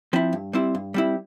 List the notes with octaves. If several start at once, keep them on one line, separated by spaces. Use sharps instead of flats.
F3 C4 E4
G2
G3 C4 E4
G2
G3 C4 E4